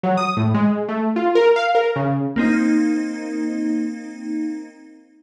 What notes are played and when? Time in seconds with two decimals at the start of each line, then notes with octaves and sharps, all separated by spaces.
0.03 F#3
0.17 D#6
0.37 A2
0.54 G#3
0.89 A3
1.16 F4
1.35 A#4
1.56 F5
1.75 A#4
1.96 C#3
2.36 A#3 C4 D#4